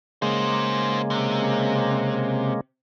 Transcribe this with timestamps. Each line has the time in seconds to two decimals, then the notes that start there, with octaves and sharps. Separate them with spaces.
0.22 C#3 G#3 A#3 G#4 C5
1.10 C3